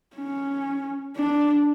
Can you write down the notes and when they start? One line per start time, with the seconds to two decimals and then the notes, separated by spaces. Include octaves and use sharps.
0.16 C#4
1.16 D4